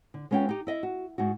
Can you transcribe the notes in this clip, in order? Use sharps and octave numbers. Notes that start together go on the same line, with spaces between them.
D3
G#3 B3 C#4 F4 G5
D#4 G4
E4 D#5 E5
F#4
G#2 D#4 F#4